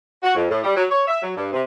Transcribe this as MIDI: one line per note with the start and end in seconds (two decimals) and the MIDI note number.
0.23 0.33 66
0.35 0.49 41
0.50 0.61 45
0.64 0.74 55
0.76 0.84 54
0.89 1.07 73
1.08 1.21 76
1.22 1.33 54
1.36 1.50 43
1.53 1.62 48